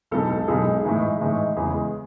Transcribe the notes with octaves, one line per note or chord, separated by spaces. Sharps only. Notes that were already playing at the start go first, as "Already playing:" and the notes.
B1 B2 G#3 D#4 A4
A4
B1 B2 G#3 D#4 G#4
A2 E3 G#3 D#4
A2 E3 G#3 D#4
E2 C#3 G#3 B3 G#4